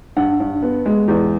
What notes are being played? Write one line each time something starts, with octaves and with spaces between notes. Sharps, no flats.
G2 F#5
G2
B3
G#3
E2